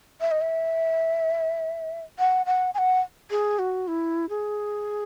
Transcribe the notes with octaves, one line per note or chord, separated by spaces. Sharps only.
E5
D#5
E5
F#5
F#5
G#5
F#5
G#4
F#4
E4
G#4